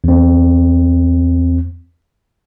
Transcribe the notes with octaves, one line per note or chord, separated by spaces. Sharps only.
E2 C4